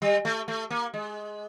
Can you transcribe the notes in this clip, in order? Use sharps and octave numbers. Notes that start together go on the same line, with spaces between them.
G3
A3
A3
A#3
G#3